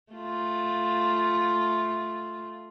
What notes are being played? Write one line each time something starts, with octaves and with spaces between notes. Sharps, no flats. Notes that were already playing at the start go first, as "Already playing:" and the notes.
A3 F4